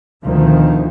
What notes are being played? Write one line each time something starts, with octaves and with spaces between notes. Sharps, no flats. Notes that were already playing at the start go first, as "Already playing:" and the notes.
D2 B2 D#3 F3